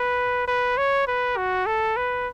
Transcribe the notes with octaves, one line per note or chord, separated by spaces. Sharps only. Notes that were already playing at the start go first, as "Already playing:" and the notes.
Already playing: B4
B4
C#5
B4
F#4
A4
B4